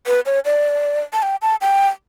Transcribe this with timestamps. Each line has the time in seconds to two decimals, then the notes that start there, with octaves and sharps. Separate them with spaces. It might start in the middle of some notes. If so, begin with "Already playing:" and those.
0.07 B4
0.26 C#5
0.45 D5
1.13 A5
1.23 G5
1.42 A5
1.61 G5